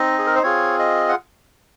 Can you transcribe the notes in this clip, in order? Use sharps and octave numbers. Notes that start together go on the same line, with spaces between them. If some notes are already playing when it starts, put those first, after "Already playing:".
Already playing: C4 D#4 D#5
G#4
A#4
C5
C4 F4 G#4 C#5
D#5
F#5